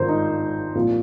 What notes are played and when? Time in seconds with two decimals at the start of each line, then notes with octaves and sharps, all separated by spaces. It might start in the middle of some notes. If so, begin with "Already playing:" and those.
Already playing: G#1 G2 F3 A#4 C5 D5
0.08 D#4
0.75 C2 A#2 F3